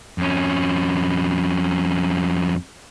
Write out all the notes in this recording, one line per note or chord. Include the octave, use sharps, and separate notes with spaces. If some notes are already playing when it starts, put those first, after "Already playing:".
F2 C#4